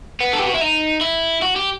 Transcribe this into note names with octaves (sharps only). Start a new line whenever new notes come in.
B3
A4
G4
F#4
E4
D#4
E4
F#4
G4